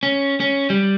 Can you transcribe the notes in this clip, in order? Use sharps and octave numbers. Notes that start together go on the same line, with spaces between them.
C#4
C#4
G3